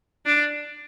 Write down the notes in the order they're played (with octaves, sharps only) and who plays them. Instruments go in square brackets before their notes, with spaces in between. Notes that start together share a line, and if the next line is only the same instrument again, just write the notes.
[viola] D4